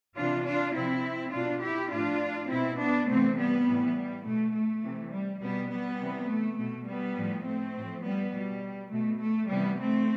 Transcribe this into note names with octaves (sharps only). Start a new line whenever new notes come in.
C3 E3 D4 F4
D4 F4
C3 F3 C4 E4
B2 D4 F4
E4 G4
A2 F3 D4 F4
B2 C4 E4
B3 D4
C3 E3 A3 C4
G3 B3
A2 E3
G3
B2 A3
A3
C3 E3
G3
B2 G3 B3
G3 B3
C3 E3
A3
B2 A3
G3 B3
A2 F3
A3 C4
A2 F3
G3 B3
B2 G3
B2 A3
A3
C3 E3 G3 B3
A3 C4